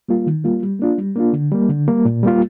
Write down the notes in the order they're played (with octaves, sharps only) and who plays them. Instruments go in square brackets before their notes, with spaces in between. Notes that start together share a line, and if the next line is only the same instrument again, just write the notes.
[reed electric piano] G3 A#3 F4
D#3
G3 A#3 F4
G3
A#3 D4 F4
G3
A#3 D4 F4
D3
G3 A#3
D3
G3 A#3
A#2
G3 A#3 F4